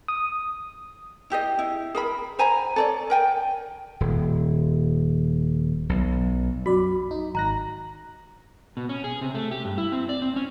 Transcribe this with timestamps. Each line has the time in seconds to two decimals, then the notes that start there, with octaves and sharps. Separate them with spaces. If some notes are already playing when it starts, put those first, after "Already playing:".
0.08 D#6
1.30 E4 G4 G#4 D#5
1.59 E4
1.95 G#4 A#4 B5
2.39 C5 G#5 A#5 B5
2.76 A4 C#5 D5
3.10 A#4 G5 G#5
4.00 D#1
5.89 B1
6.66 F#2 F#4 D5 B5
7.11 D#4
7.35 G#1 A#5 F#6 A#6
8.77 B2
8.89 C#4
9.04 G#4
9.21 C3
9.35 A3
9.51 G4
9.65 G2
9.78 E4
9.92 C4
10.09 D5
10.22 C4
10.36 C#4